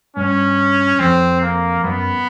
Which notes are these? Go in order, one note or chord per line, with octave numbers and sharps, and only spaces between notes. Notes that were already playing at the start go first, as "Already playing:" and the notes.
G2 C#4
F2 C4
A#3
F#2 B3